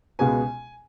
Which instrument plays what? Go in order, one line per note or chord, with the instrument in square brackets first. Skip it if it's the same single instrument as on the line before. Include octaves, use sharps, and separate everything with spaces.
[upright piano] C#2 B2 G#3 B3 G#5